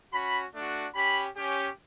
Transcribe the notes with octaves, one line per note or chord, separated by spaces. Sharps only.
C#4 F#4 B5
A3 D4 F#4
C#4 G4 B5
C#4 G4